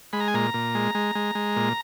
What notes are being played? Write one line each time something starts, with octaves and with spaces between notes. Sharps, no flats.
G#3 B5
A#5
G#5
A#2 A#5
A#2
G#3
G#3
G#3
G#3
A#2